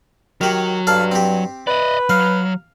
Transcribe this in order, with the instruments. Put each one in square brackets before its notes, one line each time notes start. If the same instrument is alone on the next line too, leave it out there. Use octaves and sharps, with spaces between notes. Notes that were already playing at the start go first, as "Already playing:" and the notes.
[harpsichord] D#3 G4 [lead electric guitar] F#3
[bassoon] G2 [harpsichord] A4 F5 A5
[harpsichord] C4 G4
[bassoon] B4 [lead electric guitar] D5 D#5
[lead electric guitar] F#3 [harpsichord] F5